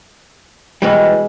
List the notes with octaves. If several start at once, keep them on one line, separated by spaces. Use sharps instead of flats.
B2 E3 G3 G#3